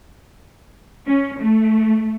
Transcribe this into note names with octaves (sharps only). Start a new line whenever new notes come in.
C#4
A3